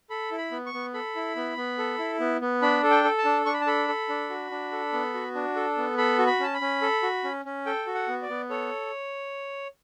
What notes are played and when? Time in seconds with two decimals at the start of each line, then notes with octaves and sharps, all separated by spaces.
0.10 A4 B5
0.31 E4
0.38 B5
0.52 B3
0.66 C#6
0.73 B3
0.94 A4 B5
1.16 E4
1.36 B3
1.57 B3
1.78 A4
1.99 E4
2.20 B3
2.41 B3
2.62 D4 B5
2.83 A4
2.90 G5
3.04 A4
3.18 A5
3.25 D4
3.46 D4 C#6
3.54 B5
3.61 A5
3.67 A4 B5
3.88 A4
4.09 D4
4.30 F#4
4.51 D4
4.72 A4
4.93 B3
5.14 F#4
5.35 D4
5.56 A4
5.77 B3
5.98 A4 B5
6.18 F#4
6.26 B5
6.40 C#4 A5
6.54 B5
6.61 C#4
6.82 A4
7.03 F#4
7.24 C#4
7.45 C#4
7.66 A4 G5
7.87 F#4
7.95 F#5
8.08 B3
8.22 D5
8.29 B3
8.50 A4 C#5